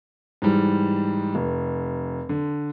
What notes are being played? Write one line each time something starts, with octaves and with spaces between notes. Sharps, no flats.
G#2 E3 G3
F1
D3